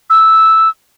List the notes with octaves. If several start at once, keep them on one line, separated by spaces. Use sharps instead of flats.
E6